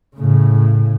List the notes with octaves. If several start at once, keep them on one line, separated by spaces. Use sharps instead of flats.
A2 C#3